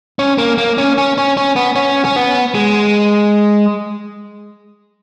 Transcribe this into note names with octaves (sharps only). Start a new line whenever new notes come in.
C#4
A#3
A#3
C#4
C#4
C#4
C#4
B3
C#4
C#4
B3
G#3